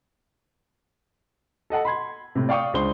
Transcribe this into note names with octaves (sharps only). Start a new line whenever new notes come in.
A4 D#5 F#5 A5
B5 C6 G#6
A2 C3
D5 F5 G5 C#6 D#6
C#2 D4 C5 C6 G7